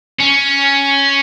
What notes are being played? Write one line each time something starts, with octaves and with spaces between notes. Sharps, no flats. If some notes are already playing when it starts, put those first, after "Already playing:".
C#4